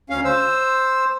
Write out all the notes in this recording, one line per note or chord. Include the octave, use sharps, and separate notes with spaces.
D2 C#4 F5
C5 E6